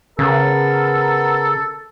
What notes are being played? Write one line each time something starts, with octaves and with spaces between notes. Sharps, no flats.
C#3 B3 A4 A#4